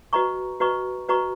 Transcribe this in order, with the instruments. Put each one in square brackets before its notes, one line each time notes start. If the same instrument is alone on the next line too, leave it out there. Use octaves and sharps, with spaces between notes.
[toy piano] F#4 B4 D#5 A#5 C#6
F#4 B4 D#5 A#5 C#6
F#4 B4 D#5 A#5 C#6